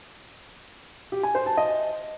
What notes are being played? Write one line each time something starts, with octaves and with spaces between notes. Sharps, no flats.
G4
G#5
C5
A5
D#5